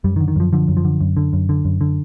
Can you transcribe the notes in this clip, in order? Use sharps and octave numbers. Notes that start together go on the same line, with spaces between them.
F#2 G3
D#3
D3
D#3
F#2 F3
D3 F3
F#2
F3
D3
F#2
D3
F#2
D3
F#2
D3